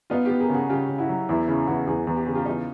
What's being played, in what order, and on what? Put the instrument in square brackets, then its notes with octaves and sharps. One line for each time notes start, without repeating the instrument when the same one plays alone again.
[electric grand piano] B3 [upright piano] D#4 F4
[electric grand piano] B3 [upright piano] F4 G4
[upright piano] G#4 A#4
[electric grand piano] C#3 [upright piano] F#4 G#4
[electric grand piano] C#3 [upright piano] F4 G4
[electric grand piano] C#3
[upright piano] E4 F#4
[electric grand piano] F#3
[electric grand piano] E2 [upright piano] E4
[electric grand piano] C#3 [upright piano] E4
[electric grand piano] E2 [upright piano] E4 F#4
[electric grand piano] E2 [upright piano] F#4 G#4
[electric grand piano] E2
[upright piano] G4
[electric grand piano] C#3 [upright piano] G#4
[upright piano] F4 G4
[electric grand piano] E2 [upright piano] D#4 F4